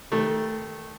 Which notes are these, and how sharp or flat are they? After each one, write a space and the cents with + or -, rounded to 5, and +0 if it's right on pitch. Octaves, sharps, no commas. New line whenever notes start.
D#3 +15 A3 +0